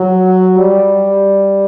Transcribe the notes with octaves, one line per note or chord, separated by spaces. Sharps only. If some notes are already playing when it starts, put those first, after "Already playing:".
Already playing: F#3
G3